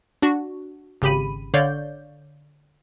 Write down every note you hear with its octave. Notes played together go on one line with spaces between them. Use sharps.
D4 F#4
G#1 C#3 G4 B5 D#7
D3 C#5 D5 F5 G6